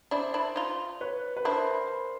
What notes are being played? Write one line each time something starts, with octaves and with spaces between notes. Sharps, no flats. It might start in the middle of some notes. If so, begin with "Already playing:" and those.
D4 E4 C5 D5
D4 E4
D#4 F4
B4 C#5
B4
D4 E4 A#4 C5